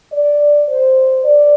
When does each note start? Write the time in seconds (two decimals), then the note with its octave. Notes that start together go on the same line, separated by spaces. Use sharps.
0.13 D5
0.69 C5
1.25 D5